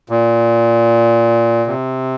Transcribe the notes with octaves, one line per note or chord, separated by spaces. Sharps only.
A#2
C3